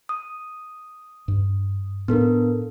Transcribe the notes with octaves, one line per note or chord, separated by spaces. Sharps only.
D#6
G2
A2 B3 D4 A4 A#4